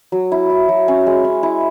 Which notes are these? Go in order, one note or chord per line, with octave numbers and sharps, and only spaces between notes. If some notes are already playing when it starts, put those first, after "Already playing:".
F#3
E4
E4
F#3
C#4
G#3
C#4
E4